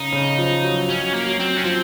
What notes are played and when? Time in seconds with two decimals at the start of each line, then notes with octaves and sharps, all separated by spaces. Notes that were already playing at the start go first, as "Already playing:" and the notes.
Already playing: C#3 D#4
0.12 C#3
0.38 F3
0.63 F#3
0.88 F#3 C#4
1.13 A#3
1.27 F#3
1.40 C4
1.57 C#4
1.64 F3 C4